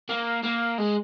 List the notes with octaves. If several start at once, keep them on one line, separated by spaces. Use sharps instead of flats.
A#3
A#3
G#3